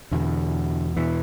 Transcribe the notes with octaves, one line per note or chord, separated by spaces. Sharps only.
E2 B2 D3
E2 B2 E3